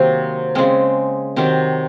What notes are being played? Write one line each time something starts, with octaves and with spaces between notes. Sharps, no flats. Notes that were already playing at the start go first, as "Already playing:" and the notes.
Already playing: C3 D#3 F#3 A#3 C4
C#3 G#3 C4
C3 D#3 F#3 C4